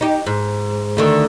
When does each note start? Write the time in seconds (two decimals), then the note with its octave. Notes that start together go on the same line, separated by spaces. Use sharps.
0.01 D#4 G4
0.27 G#2
0.97 D2 D3 D#3